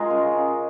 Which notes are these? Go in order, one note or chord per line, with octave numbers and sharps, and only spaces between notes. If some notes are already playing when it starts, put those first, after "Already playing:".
Already playing: G#3 F4 G#4 A#4
C#3